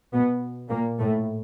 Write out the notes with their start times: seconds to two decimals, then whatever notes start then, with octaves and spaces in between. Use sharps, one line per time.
0.12 B2 B3
0.69 A#2 A#3
0.99 A2 A3